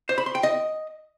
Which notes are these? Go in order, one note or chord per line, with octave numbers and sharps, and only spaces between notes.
C5
B5
C6
G5
D#5